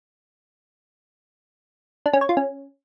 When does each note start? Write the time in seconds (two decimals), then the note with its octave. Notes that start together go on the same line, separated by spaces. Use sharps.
2.06 D4
2.13 C#4
2.21 C#5
2.29 F4
2.37 C#4